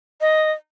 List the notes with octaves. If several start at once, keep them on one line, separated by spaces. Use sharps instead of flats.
D#5